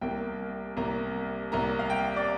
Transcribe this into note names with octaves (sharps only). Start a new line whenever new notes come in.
C2 C3 A#3 G5
C2 C3 A#3 A#5
C2 C3 A#3 A#5
F5
G5
D5